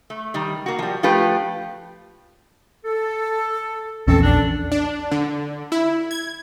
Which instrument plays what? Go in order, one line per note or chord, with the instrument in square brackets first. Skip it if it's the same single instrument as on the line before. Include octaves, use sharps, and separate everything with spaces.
[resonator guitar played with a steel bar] A3
D#3 G3
A#3 F#4
F3 G3
F3 A3 F4 G4 B4
[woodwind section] A4
[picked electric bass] A#1 E2 C#4 [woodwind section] C4 A4
[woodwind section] D4
[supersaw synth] D4
D3
E4
G#6